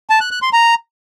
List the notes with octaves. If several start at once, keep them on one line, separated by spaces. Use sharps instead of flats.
A5
F#6
F#6
C6
A#5